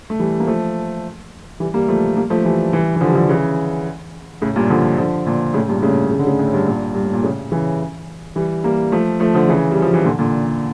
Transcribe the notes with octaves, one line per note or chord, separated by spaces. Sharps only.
A3
E3 G3
A#3
F3 A3
E3 G3
G3 A#3
F3 A3
G3 A#3
F3 A3
E3 G3
E3 G3
E3
D3 F3
G3
D3 F3
C#3 E3
A2 C#3
G2 A#2
D3 F3
D3 F3
A#2 D3
A2 C#3
G2 A#2
A2 C#3
C#3
D3
A2 C#3
A2
G2
G2 A#2
G2
A2
A#2
A2 C#3
C#3 E3
E3 G3
G3 A#3
F3 A3
F3 A3
D3 F3
C#3 E3
G3
F3
E3
A#2 D3
A#2 D3